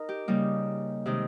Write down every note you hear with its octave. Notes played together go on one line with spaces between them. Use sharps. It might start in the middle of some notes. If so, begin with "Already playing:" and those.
Already playing: D#4 A#4
G4
C#3 G3 A#3 D#4
C3 D#3 G#3 D#4